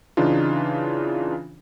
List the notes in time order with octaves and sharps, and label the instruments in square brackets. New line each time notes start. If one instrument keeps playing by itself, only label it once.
[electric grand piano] C#3 E3 D4 D#4 F4